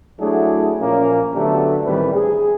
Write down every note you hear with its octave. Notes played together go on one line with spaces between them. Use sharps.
F#3 A3 D4 E4 F#4 G#4
A#2 F3 A#3 C#4
D3 F#3 A3 B3 D4 G4
A1 D#3 E3 G3 C4 B4
G#4